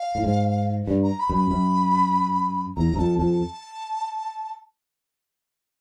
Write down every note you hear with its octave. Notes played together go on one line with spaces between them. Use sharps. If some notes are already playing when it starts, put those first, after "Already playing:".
Already playing: F5
A2
G#2
G2
A#5
B5
F#2
B5
F#2
E2 A#5
F#2
F2 A5
F2 A5